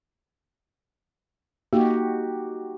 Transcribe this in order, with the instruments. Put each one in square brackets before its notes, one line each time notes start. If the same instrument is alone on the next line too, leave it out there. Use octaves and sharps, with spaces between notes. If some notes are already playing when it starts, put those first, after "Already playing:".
[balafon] A#3 [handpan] D#4 F#4 G4